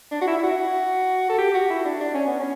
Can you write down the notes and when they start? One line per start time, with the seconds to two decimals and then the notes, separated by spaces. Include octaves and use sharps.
0.12 D4
0.21 F#4
0.27 E4
0.38 E4
0.43 F#4
1.30 A4
1.38 G4
1.54 F#4
1.70 E4
1.85 D4
2.00 D4
2.14 C#4
2.26 B3
2.39 C#4